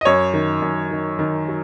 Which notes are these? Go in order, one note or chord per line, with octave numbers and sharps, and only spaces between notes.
D#5
F#2 C#5
D#3
F#2
D#3
D#3
F#3